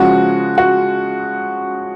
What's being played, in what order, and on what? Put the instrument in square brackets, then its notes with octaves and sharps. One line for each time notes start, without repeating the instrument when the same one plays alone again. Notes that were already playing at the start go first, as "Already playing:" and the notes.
Already playing: [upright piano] C#3 F3 G#3 F#4
F#4